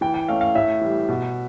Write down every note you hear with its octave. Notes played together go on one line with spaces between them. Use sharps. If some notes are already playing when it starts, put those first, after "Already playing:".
E3 G5
G5
A3 C#4 F5
F5
A2 E5
E3 G3
B2